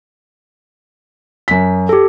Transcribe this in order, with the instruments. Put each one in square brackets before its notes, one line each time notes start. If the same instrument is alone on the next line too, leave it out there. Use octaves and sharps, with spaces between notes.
[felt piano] F#2 B6
[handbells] G4 A4